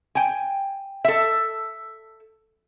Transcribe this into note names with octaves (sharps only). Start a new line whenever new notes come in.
G5 G#5
A4 E5